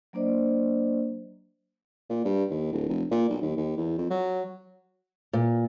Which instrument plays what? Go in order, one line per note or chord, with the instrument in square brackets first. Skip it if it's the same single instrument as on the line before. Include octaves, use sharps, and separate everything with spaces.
[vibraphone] F#3 A#3 D4 C5 D5 D#5
[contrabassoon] A#2
G2
D#2
D1
F1
A#2
B1
D#2
D#2
E2
F2
F#3
[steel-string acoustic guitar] A#2